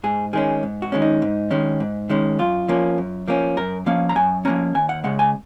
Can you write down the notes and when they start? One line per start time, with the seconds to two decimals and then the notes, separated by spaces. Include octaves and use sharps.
0.04 G#2 G#4
0.33 D#3 G#3 C#4 G#4
0.63 G#2
0.82 F#4
0.92 D#3 G#3 C#4
1.02 D#4
1.22 G#2
1.51 D#3 G#3 C#4
1.80 G#2
2.09 D#3 G#3 C#4
2.39 F#2 F4
2.68 F3 A#3 C#4
2.98 F#2
3.28 F3 A#3 C#4
3.57 F#2 A#4
3.86 F3 A#3 C#4 F5
4.09 A#5
4.16 F#2 G#5
4.45 F3 A#3 C#4 A#5
4.75 D#2 G#5
4.89 F#5
5.04 C#3 G#3 F#5
5.19 G#5